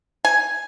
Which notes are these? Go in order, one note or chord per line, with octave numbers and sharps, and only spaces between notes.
G#5